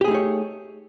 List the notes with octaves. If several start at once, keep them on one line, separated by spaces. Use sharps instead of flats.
A3 D#4 G4 G#4 C#5